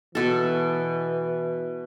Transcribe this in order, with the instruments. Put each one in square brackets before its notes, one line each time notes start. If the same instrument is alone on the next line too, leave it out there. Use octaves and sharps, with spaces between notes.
[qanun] B2 A4 [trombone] E3